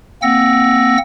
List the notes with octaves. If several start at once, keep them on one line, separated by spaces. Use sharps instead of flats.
A#3 C4 F#5 E6 A#6